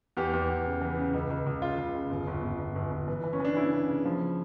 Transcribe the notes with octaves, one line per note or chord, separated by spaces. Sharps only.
E2 G4
E2
E2
C#3
E3
C#3
C#2
C#2
C#2
C#3 F4
C#2
C#3
G1
G1
G1
G1
G1
G1
E3
E3
C#4
E3 D4
C#3 E4
C#3
C#3
F3